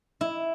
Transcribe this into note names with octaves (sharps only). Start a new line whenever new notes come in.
E4